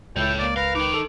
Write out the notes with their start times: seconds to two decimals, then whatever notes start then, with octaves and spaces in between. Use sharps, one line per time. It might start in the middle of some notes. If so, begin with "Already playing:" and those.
0.16 C#2 E4 A4 C#5 G5
0.39 A#3 D5
0.56 A#4 B4 F5
0.75 D#4 A#4 D6
0.94 A4